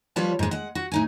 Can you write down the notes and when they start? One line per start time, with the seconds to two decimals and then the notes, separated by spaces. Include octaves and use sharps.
0.16 F3 G3 F4 B4 C#5 A5
0.39 G#2 G#3
0.51 G#3 F#5
0.75 F#4
0.92 A2 D#4 G#5